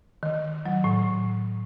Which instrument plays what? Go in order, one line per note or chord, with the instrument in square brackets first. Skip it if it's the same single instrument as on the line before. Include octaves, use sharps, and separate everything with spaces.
[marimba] D#3
F#3
A2